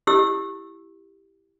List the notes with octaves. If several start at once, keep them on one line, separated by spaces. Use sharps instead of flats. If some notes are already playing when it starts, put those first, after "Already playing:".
E4 G4 E6